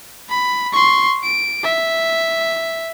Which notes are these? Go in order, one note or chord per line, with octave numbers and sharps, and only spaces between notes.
B5
C6 C#6
D7
E5